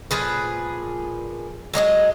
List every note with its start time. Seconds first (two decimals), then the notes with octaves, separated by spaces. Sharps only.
0.11 A#2 F3 G#4 B4
1.74 F#3 G#3 D5 D#5